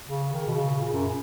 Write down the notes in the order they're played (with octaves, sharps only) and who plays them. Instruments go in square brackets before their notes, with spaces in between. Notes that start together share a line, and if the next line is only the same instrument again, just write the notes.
[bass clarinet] C#3
D#3
B2
C#3
A#2
F#2